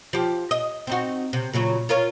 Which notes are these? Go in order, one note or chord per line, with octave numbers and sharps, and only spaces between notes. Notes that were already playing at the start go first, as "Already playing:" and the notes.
F3 G4
D#5
C4 D#4 F#4
C3
A#2 C#3 F#3
F4 A#4 C#5